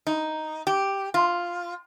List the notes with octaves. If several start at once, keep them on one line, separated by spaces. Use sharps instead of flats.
D#4
G4
F4